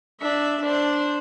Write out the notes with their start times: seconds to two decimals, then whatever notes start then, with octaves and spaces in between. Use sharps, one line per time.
0.21 D4 E5
0.63 D4 C5